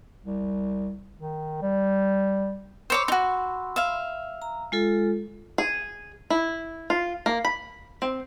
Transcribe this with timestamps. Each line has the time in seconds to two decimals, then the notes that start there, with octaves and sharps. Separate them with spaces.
0.24 C2
1.17 D#3
1.62 G3
2.90 C5 C#5 B5 C6 D6 E6
3.08 D#4 F#4
3.76 E5 F5
4.42 A#5
4.72 G#3 F4 A4
5.58 G#4
6.30 E4
6.90 F4
7.26 A#3
7.45 B5
8.02 C4